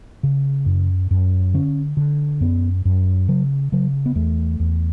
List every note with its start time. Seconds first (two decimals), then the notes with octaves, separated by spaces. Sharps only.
0.23 C#3
0.66 F#2
1.11 F#2
1.54 D3 C#4
1.97 D3
2.41 F#2 B3
2.85 F#2
3.28 C#3 F#3
3.72 C#3 F#3
4.06 B3
4.15 E2 A3
4.60 E2